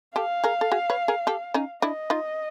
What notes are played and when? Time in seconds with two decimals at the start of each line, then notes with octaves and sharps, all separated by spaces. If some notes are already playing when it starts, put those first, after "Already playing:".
0.16 G4 A4 F5
0.44 G#4 A#4
0.61 A4
0.72 F#4 G#4
0.90 B4 C#5
1.08 G#4 A#4
1.27 G4 A4
1.54 C#4 D#4
1.82 D4 E4 D#5
2.10 D#4 F4